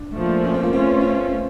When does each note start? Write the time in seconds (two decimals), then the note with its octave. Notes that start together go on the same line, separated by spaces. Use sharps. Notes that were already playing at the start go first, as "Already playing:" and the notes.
Already playing: D4
0.15 A#2 F3 A3
0.45 C#4
0.54 C4
0.63 A#3
0.73 A3 C4 C#4 F4
0.87 B3
1.01 C4